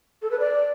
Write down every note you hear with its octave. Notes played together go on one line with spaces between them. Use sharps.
A4
B4
D5